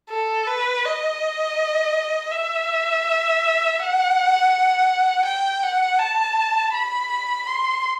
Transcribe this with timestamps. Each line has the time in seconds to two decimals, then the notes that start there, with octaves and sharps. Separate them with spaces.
0.10 A4
0.47 B4
0.85 D#5
2.31 E5
3.79 F#5
5.26 G5
5.63 F#5
5.99 A5
6.74 B5
7.47 C6